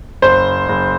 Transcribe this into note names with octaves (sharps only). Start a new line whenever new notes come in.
F#1 C5
F#1